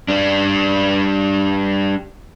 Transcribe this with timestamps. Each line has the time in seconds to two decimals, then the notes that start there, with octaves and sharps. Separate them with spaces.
0.08 G3 D4